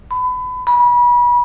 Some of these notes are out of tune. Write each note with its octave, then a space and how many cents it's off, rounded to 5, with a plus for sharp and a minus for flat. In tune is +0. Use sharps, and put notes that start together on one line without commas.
B5 +30
B5 -30